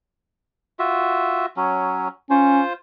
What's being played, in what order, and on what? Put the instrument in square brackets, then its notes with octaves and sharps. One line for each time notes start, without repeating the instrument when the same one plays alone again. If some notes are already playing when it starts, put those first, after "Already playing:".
[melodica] F4 F#4 E5
F#3 C#4
[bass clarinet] C#4 [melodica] F4 C5